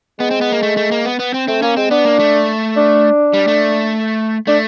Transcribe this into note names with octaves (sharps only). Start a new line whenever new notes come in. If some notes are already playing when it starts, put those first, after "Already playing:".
G#3 B3
C4
B3
A#3
A3
A3
A#3
B3
B3
C4
A3 C4
A#3 C#4
G#3 C4
B3 D4
A#3
A3
D4
G3
A3
A3 D4